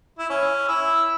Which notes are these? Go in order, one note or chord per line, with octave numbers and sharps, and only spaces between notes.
E4
C#4
E4